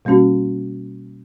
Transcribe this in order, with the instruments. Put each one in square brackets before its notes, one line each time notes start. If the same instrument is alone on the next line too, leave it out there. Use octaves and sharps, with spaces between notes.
[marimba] B2 G3 A#3 C#4 F#4